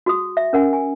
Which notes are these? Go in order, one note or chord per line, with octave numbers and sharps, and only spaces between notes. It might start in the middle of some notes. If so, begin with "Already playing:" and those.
F#4 G#4 D#6
E5
C#4 A#4 F#5 G#5
G#5